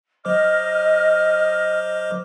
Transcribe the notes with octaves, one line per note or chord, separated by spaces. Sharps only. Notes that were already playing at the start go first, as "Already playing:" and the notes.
F#3 C5 D#5 D6 F6